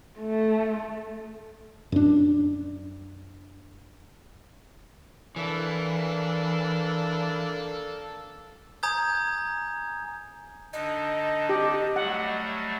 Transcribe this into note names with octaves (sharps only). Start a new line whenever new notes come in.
A3
F#2 D4
E3 A#3 D4 A4
G#5 A#5 D#6 G6 G#6
D3 D4 D#4 D#5
G4
F#3 G3 A3 F#5